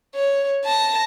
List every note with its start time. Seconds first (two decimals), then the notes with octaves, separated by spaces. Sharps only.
0.15 C#5
0.65 A5 A#6